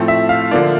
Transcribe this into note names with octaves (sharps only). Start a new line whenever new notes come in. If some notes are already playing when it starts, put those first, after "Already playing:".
Already playing: A2 F3 A3 C4
E5
F5
D3 F3 A#3 D4